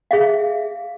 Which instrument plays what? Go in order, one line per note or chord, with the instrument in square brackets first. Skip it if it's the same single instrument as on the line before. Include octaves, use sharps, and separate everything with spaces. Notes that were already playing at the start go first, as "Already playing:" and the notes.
[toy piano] G#4 E5 F5